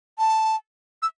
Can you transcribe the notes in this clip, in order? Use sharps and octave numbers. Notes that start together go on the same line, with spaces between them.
A5
E6